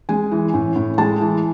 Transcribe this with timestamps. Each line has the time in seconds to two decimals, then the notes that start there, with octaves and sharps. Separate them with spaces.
0.09 G#3 G#5
0.31 E3
0.54 A2
0.76 A2
0.98 G#3 A5
1.21 E3